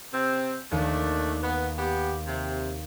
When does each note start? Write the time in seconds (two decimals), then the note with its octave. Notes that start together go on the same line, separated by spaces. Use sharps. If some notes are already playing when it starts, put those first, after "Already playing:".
0.14 C3 C4
0.72 D#2 A3 D4
1.43 B3
1.78 B3 G4
2.27 C3